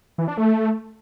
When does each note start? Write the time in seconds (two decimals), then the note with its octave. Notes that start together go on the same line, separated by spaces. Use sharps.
0.18 E3
0.28 D4
0.37 A3